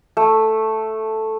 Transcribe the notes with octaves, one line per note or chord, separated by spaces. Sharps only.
A3